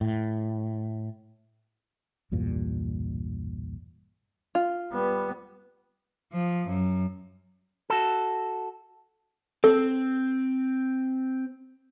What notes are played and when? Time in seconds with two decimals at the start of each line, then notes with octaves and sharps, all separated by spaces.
0.01 A2
2.31 B1 E2 G2 A#2
4.55 F4
4.92 G3 B3
6.33 F3
6.68 F#2
7.90 F#4 A4
9.64 C4 A4